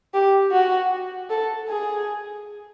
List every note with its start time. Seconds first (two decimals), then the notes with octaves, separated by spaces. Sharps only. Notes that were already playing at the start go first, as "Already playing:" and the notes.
0.14 G4
0.52 F#4
1.30 A4
1.69 G#4